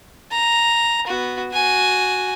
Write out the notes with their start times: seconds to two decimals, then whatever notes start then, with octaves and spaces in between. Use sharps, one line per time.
0.32 A#5
1.07 B3 F#4
1.53 F#4 G#5